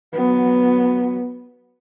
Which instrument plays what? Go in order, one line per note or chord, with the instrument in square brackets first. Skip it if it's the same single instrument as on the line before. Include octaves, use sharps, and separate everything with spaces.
[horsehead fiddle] F#3 B3